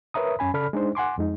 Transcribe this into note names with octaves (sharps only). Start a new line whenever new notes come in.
A#4 B4 C#5 E5 A#5 D#6
F#2 C#4 G#5 B5
C#3 A4 D5 B5 F6
G#3 D4 D#4 C5
F#5 G#5 C6 D6
F2 G#3 D#4